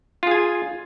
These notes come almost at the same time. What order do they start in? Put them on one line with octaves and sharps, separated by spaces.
F4 G#4 G#5